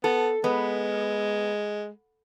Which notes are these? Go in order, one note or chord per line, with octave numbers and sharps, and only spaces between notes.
B3 A4
G#3 B3